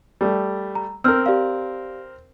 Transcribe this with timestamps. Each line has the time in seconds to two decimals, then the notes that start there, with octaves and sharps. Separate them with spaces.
0.21 G3 A3
0.75 A#5
1.04 C4 A#4 E6 F6 G6
1.26 G4 D5 F5